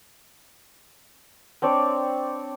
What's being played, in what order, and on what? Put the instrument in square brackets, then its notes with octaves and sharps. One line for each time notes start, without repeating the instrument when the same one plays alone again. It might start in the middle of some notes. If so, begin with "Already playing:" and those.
[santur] C4 D4 C#5 D5